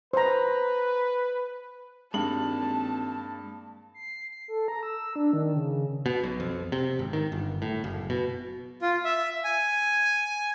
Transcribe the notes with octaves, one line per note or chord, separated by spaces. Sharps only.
B4 C5 A#5
G#1 G2 G#3 A#3 A5 F#7
C7
A4
A#5
E6
D4
D#3
C#3
B2
B1
F2
C3
G#1
D#3
G1
A2
F#1
B2
F4
E5
G#5